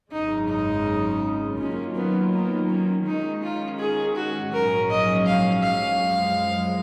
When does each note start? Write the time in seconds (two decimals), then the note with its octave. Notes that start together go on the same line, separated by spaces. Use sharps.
0.12 G#1 F#2 C#3 G#3 D#4
0.48 D#4
1.58 D#3 F#3 A#3 C#4 F4
1.96 B3
2.33 B3
2.69 C#4
3.06 D#3 G#3 C#4 D#4
3.42 F4
3.79 G#4
4.16 F#4
4.52 A#1 G#2 F#3 C#4 G#4 A#4
4.90 D#5
5.26 F5
5.63 F5
6.00 F#2 F3 G#3